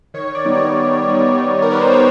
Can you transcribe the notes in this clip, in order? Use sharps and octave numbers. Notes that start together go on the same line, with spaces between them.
D#3 C#5
D5
G3 B3 D#4
C#5
D#3
G3 B3 D#4
D#3
A#4
G3 B3 D#4 B4
C5
C#5